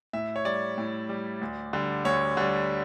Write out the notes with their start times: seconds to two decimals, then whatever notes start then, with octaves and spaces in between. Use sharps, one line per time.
0.13 A2 E5
0.36 C#5
0.45 G3 D5
0.78 A2
1.09 G3
1.41 D2
1.73 D3 G3
2.05 D2 C#5
2.37 D3 G3